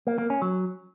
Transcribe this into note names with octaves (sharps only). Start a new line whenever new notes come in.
A#3
A#3
C#4
F#3